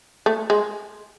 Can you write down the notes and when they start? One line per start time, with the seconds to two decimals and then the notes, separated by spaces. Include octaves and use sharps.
0.26 A3
0.50 G#3